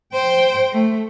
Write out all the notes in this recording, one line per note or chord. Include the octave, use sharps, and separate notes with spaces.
C5 G5
A3